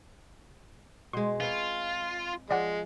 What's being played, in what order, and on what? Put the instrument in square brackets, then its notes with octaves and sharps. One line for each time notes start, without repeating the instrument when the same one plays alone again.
[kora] B2 G#3 [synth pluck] C6
[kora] C4 B4 C#5 [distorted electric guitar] F4
[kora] F3 [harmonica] G#3 [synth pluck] D5 F#5